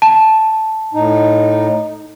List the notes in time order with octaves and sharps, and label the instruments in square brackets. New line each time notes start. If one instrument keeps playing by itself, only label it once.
[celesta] A5
[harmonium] A2 D#4